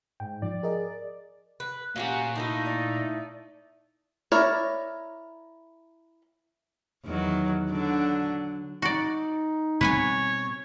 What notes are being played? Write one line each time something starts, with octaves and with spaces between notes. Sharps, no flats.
G#2 G5
F3 D5
G#4 A#4 D#5
B4
A#2 A#3 C#4 F#4 G4 F#5 A#5
A3 A#3 D#4 E4
D5
E4 A#4 C#5 D5
E2 D#3 F#3
D3 F#3 D4
D#4 F#4 D5
B2 G3 C4 B4 C#5 F#5 G#5